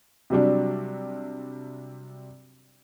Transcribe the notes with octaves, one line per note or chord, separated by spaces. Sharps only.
C3 F#3 G3 D4